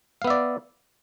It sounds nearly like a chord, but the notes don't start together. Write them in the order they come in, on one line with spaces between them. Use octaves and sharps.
F5 B3 E5 D5